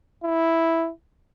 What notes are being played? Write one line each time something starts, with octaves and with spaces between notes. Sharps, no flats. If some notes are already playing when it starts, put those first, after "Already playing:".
E4